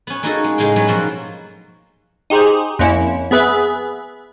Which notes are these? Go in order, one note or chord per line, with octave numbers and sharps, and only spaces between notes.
B3 C#4
A#3 C#4 D#4 F#4 G#4 A4
G#3
A2 C#3 G#3 F5 G5
F#3 G3 B3
G#2 B2 F3 A#3 F#4 C6
D#4 G4 G#4 C5
F2 A#3 C#4 E4
B3 G#4 B4 E5